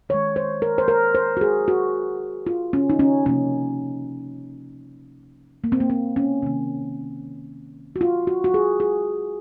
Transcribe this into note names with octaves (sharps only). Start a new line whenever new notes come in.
D#3 G#3 C#5
C5
A#4
C5
A#4
C5
F#4
G#4
F#4
F4
C#4
D#4
C#4
C3 F3 A#3 C#4
A#3
C4
A#3
C4
C#4
C3 D#3 A#3
F#4
F4
F#4
F#4
G#4
G#4